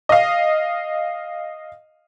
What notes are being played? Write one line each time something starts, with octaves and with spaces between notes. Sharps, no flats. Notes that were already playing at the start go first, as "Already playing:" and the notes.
D#5 F5